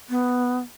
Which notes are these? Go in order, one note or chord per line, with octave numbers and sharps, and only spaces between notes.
B3